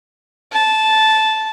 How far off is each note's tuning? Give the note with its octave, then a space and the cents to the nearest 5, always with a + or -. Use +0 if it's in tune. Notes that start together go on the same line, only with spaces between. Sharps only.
A5 -10